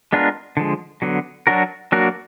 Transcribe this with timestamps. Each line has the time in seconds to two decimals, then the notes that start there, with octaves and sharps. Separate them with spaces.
0.13 G#3 B3 D4 F4 A#4
0.57 D3 F3 G#3
1.02 D3 F#3 B3
1.47 F#3 D4 F#4 A#4
1.92 F#3 A#3 D4 F#4 A#4